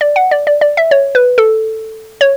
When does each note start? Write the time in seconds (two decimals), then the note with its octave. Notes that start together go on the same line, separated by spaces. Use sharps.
0.01 D5
0.16 F#5
0.31 D5
0.47 D5
0.61 D5
0.77 E5
0.91 C#5
1.15 B4
1.38 A4
2.21 C#5